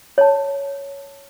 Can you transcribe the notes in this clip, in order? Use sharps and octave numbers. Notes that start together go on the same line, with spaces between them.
C#5 A5